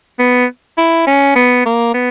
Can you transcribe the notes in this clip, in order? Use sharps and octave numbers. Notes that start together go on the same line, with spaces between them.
B3
E4
C#4
B3
A#3
B3